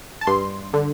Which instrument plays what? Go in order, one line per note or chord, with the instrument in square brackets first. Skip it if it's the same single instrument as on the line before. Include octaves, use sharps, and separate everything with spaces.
[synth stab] A5
G2 C6
D3